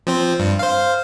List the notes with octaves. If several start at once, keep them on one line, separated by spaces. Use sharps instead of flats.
F3 C4 C5
G2
C5 F5